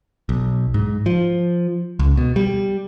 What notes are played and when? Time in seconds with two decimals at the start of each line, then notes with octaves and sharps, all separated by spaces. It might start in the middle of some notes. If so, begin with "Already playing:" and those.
0.29 B1
0.74 G#2
1.06 F3
1.99 C#2
2.17 B2
2.36 G3